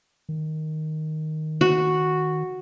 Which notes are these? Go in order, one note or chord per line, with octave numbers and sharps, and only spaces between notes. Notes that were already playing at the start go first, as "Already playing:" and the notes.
D#3
F#4